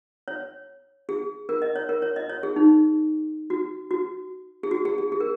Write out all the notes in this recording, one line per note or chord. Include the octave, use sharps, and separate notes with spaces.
C#5
G#4
A#4
D#5
C#5
A#4
C#5
D#5
C#5
G#4
D#4
F#4
F#4
G#4
F#4
G#4
G#4
G#4
A#4